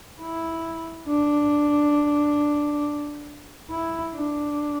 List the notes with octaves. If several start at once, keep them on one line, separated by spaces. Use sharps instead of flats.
E4
D4
E4
D4